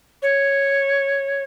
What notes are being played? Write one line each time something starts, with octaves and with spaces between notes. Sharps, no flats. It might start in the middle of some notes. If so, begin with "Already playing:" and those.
C#5